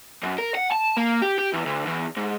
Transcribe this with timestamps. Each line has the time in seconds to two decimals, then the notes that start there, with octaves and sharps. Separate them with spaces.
0.23 F#2
0.39 A#4
0.55 F#5
0.72 A5
0.97 A#3
1.22 G4
1.39 G4
1.54 E2
1.66 D2
1.87 E2
2.17 G#2